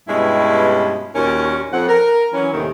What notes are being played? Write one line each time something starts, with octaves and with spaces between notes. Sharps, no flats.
G2 B2 G#3 C#4 E4 G4
D#2 A#2 C#4 F#4 A#4
F2 C4 F#5
A#4
E3 F#3 C#4
D#2 A2 C3 D#3